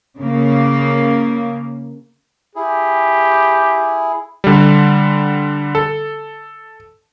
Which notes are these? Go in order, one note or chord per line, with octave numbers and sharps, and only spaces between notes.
C#3 A#3
E4 G4 G#4
D3 G3
A4